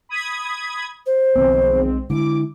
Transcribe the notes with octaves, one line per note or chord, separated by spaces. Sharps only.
B5 D#6 G#6
C5
B1 D#3 F3 G#3 B3 C4
D3 G#3 E4 D6